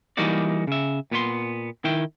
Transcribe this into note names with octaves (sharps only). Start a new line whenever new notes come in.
E3 G3 A#3 D#4 F#4 D5
C#3 E5
A#2 B3 C#5 C6
D#3 E4 G5